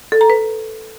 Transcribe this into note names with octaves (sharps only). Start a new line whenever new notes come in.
A4
A#5
B4